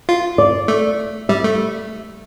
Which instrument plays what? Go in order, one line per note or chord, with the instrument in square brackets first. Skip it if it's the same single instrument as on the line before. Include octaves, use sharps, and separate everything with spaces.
[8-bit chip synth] F4
[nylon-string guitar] D5
[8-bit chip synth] A3
[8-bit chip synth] G3 [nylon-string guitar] E5
[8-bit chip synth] A3